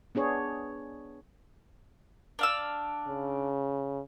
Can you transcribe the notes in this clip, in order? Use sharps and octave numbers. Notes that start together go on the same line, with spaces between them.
B3 D4 G#4 C#5
D4 F5 E6
C#3